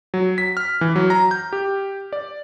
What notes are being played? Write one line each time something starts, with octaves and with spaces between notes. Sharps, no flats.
F#3
B6
F6
E3
F#3
A#5
G6
G4
D5